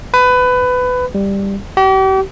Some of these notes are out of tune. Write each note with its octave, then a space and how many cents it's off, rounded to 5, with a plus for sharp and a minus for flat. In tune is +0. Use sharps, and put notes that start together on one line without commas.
B4 +20
G3 +10
G4 -40